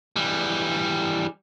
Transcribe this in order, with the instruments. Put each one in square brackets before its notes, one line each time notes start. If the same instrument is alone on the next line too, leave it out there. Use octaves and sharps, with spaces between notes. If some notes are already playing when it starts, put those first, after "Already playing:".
[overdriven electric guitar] E3 G3